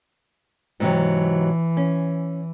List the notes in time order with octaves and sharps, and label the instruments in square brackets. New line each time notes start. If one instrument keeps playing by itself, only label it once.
[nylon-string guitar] G#2 C3 F#3 [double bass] E3
[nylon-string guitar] C#4